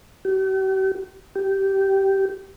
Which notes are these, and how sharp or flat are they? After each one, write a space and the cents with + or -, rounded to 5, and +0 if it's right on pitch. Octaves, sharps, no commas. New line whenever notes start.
G4 -45
G4 -15